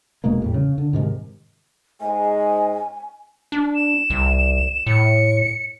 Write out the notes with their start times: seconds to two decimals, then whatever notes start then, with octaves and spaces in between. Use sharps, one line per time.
0.24 E1 B2 G#3 A#3
0.42 E2 A2 G3
0.54 C#3
0.78 D3
0.93 G#2 C3 D#3 G#3
2.01 G#2 G#3 G#5
3.52 D4
3.75 E7
4.10 C2
4.86 A2 C#7